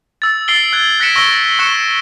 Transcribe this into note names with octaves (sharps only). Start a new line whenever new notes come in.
E6 A6
E6 A6 C7 D7 G7
F#6 G#6 C7
F#6 A#6 B6 C#7 D7 E7
C#6 E6 A#6 G7
C#6 F#6 C#7 E7 G7